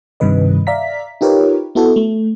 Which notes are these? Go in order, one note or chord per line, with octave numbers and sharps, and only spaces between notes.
G2 C3 D#3 B4 D#5
D5 E5 F5 A#5 B6
D#4 F4 G4 A#4 B4 C#5
B3 E4 F#4 A4
A3